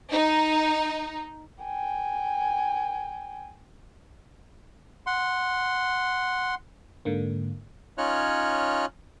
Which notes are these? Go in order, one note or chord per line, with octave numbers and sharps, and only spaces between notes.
D#4
G5 G#5
F#5 C6
G#2 D3 A#3
C#4 D#4 F4 C#5 F6 F#6